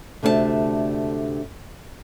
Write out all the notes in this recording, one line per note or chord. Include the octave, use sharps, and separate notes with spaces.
D2 C3 A3 D4 G#4 A5